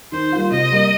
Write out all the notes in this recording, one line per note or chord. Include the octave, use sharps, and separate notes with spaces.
D#3 C5
G3 A#3 F4
C3 D#5
G3 A#3